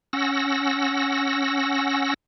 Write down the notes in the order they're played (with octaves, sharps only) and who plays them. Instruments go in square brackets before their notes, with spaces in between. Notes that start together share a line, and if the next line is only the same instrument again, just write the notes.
[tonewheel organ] C#4 F#5 E6 A#6